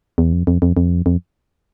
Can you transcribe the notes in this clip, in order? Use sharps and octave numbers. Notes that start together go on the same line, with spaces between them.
E2
F2
F2
F2
F2
F2